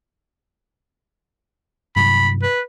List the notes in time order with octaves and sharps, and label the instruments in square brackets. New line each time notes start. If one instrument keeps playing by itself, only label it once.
[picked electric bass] G2 C3 F#3 [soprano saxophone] B5
[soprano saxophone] B4